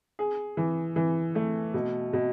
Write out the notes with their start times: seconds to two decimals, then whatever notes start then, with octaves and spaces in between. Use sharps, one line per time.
0.19 G#4
0.57 E3
0.96 E3
1.35 A3
1.74 B2
2.13 B2